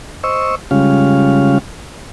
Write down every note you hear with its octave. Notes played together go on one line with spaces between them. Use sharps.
C5 D#5 C#6 E6
C#3 G3 G#3 C#4 F4 F5